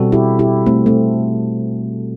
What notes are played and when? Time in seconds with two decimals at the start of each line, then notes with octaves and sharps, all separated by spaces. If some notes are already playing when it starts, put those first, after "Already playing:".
Already playing: B2 G3 C4 F#4 A4
0.12 E4 G4
0.39 E4 G4
0.66 A3 C4
0.86 A3 C4